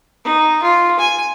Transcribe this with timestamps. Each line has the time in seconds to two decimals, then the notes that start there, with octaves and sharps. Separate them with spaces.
0.24 D#4
0.63 F4
0.99 G#5